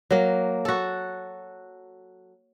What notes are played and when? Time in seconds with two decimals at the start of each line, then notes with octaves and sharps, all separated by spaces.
0.11 F#3 A#3
0.65 F#4 A4